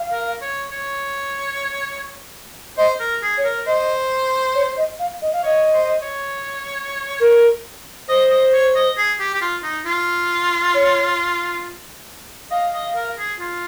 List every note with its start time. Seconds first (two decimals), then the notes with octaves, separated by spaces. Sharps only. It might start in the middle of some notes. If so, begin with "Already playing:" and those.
Already playing: F5
0.12 A#4
0.41 C#5
0.71 C#5
2.77 C5 D#5
3.00 A#4
3.22 G#4
3.37 C#5
3.45 A#4
3.66 C5 D#5
4.55 C#5
4.77 D#5
4.99 F5
5.22 D#5
5.33 F5
5.43 C#5 D#5
5.73 C5
6.02 C#5
7.20 A#4
8.08 C5 D#5
8.31 D#5
8.53 C#5
8.75 D#5
8.97 G#4
9.20 G4
9.34 G4
9.41 F4
9.63 D#4
9.86 F4
10.74 C#5
12.51 D#5 F5
12.73 D#5
12.95 A#4
13.18 G#4
13.40 F4